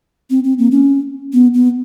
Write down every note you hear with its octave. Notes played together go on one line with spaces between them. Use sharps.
C4
C4
A#3
C#4
B3
B3